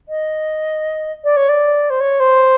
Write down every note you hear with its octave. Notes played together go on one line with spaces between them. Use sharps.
D#5
D5
C#5
D5
C5
C#5
C5